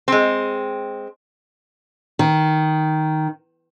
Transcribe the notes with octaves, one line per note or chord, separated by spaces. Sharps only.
G#3 C4
D#3